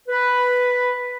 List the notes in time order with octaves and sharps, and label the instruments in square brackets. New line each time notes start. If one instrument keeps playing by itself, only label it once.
[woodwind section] B4